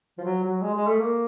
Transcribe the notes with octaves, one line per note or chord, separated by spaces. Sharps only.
F3
F#3
F#3
G#3
G#3
A3
A#3